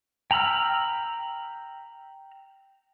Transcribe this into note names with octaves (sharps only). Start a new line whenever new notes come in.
G5 A#5 B5 E6 F6